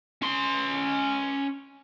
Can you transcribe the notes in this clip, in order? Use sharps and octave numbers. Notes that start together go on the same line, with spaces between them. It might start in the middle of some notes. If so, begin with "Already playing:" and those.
C#4 C6